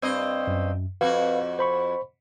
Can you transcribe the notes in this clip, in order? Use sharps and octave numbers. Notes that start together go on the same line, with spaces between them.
G2 C4 D#5
F#2
F2 F#4 B4 F5
C5 B5 C#6